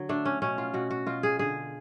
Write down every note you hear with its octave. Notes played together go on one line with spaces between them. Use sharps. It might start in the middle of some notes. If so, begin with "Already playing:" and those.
Already playing: D3 F#3
A3 D4
C#4
B2 C#4
F4
B2 F#4
F#4
B2 F4
G#4
D3 G#4